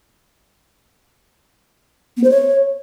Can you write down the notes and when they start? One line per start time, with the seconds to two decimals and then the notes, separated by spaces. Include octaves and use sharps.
2.17 B3
2.24 C5
2.30 C#5